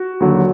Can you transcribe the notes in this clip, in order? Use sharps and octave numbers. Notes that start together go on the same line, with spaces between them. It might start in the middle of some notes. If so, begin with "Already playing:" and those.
Already playing: F#4
D#2 D3 F#3